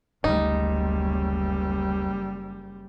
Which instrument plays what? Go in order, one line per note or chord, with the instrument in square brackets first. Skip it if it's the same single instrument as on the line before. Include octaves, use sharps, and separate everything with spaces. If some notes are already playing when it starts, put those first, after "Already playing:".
[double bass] F#1 G3 [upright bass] D2 [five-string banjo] D#4